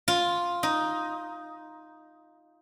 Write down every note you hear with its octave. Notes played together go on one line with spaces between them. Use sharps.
F4
D#4